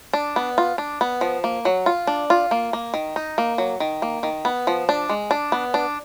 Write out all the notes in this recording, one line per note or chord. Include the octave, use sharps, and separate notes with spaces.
D4
B3
F4
D4
B3
F3
A#3
F#3
F4
D4
F4
A#3
A#3
D#3
D#4
A#3
F#3
D#3
A#3
D#3
B3
F3
D4
G#3
D4
B3
D4